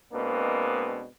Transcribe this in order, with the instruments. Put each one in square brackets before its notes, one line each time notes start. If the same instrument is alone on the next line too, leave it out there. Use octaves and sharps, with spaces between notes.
[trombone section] B2 G#3 A#3 C4 D4 B4